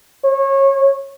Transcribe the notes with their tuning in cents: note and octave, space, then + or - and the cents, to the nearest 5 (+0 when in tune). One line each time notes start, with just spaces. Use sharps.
C#5 -25